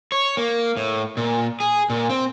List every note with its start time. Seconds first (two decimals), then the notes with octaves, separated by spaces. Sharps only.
0.12 C#5
0.37 A#3
0.77 A2
1.17 A#2
1.60 G#4
1.90 A#2
2.10 C4